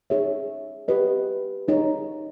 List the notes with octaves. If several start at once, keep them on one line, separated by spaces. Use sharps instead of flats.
D#4 G#4 C#5 E5
G4 B4 D#5
D#4 G#4 C#5